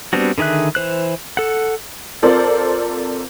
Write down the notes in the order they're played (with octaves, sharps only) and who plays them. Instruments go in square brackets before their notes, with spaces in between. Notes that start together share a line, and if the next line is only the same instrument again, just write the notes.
[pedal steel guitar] G3 B3 C4 D4 F#4
D3 D#3 G#4 E5 F#6
E3 C5 F#6
A4 F#5
[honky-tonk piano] C4 F4 A4 A#4 C5 D5